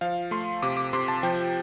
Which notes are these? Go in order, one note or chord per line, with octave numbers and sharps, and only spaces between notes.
F3 F5
A3 C6
C3 D6
D6
C3 C6
A5
F3 G5